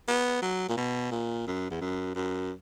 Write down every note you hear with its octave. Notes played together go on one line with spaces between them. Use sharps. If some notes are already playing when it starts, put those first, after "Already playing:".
B3
F#3
A#2
B2
A#2
F#2
E2
F#2
F#2